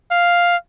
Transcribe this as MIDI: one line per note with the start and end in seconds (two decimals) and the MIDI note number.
0.11 0.56 77